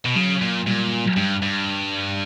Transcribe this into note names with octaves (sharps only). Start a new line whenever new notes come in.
B2
C#3 F#3
A#2
A#2 G3
F#3
G2 G3
G2